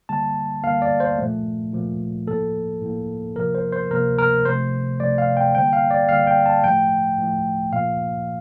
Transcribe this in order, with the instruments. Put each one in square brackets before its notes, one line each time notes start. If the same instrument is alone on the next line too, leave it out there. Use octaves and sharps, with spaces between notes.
[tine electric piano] D3 G3 A#3 A5
D3 G3 A#3 F5
D5
C5
A#2 F3 A3
A#2 F3 A3
A2 F3 A#3 A4
A2 F3 A#3
C3 F3 A#3 A#4
C5
C5
C3 F3 A#3 A#4
A#4
C3 F3 A3 C5
C3 F3 A3 D5
F5
G5
D3 G3 A#3 G5
F5
D5
D3 G3 A#3 F5
G5
A5
A2 F3 A3 G5
A2 F3 A3
A#2 F3 A#3 F5